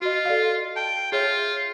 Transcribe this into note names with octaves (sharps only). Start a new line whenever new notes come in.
F4 F#4 D#5
A4 D5 F5
G5 A5
F4 G#4 C#5 E5